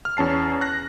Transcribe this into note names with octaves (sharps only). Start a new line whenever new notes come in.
F6
E2 C#4 A5 C7
F#6 A#6